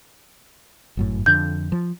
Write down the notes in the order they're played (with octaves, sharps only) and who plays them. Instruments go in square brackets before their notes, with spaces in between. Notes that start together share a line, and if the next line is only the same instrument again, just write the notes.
[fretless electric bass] G1 F#2 A2
[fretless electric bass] F2 D3 [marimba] G6
[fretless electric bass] F3